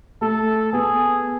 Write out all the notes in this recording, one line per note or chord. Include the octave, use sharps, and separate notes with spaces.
A3 A4
B3 G#4